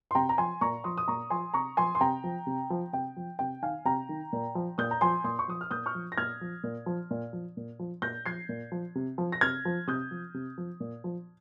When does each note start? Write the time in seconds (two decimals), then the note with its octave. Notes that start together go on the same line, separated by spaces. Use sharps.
0.11 C6
0.15 C3 G5 A#5
0.29 A#5
0.38 F3 G#5 C6
0.61 A#2 A#5 C#6
0.84 F3 C6 D#6
0.98 D#6
1.08 A#2 A#5 C#6
1.30 F3 G#5 C6
1.54 C3 A#5 C#6
1.77 F3 G#5 C6
1.95 C6
2.01 C3 G5 A#5
2.24 F3
2.47 C3
2.70 F3
2.93 C3 G5
3.16 F3
3.39 C3 G5
3.62 D#3 F5 G#5
3.85 C3 G5 A#5
4.09 D#3
4.33 A#2
4.55 F3
4.78 A#2 D#6 G6
4.91 A#5
5.01 F3 G#5 C6
5.24 A#2 C6 D#6
5.39 C#6
5.48 F3 D#6
5.61 F6
5.71 A#2 D#6 G6
5.86 C#6 F6
5.95 F3
6.12 A#6
6.17 A#2 F6 G#6
6.41 F3
6.64 A#2
6.86 F3
7.11 A#2
7.33 F3
7.57 A#2
7.79 F3
8.02 A#2 G6 A#6
8.26 F3 G#6 C7
8.49 A#2
8.72 F3
8.95 C3
9.18 F3
9.32 A#6
9.41 C3 F6 G#6
9.65 F3
9.87 C3 D#6 G6
10.11 F3
10.34 C3
10.58 F3
10.80 A#2
11.04 F3